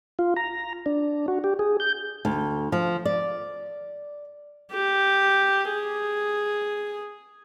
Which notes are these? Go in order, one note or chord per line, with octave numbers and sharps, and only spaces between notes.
F4
A#5
D4
F#4
G4
G#4
G6
D2
F3
D5
G4
G#4